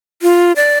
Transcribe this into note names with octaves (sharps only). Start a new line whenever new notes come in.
F4
D5